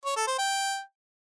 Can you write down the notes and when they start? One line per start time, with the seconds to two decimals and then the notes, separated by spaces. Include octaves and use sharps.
0.05 C#5
0.16 A4
0.27 C5
0.38 G5